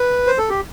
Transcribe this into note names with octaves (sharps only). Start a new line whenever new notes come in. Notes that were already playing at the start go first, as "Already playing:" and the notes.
Already playing: B4
C5
A4
G4